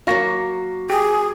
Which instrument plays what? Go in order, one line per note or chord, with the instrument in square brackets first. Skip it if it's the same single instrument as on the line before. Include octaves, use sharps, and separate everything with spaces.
[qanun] F#3 A#3 F#4 [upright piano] F5 C#6 A#6
[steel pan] G4 [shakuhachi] G#4